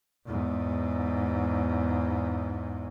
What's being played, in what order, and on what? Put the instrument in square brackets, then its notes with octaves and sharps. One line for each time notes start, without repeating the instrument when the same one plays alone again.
[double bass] E2 G#2